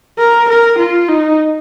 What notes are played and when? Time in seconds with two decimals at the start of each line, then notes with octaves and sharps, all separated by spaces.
0.18 A#4
0.48 A#4
0.78 F4
1.08 D#4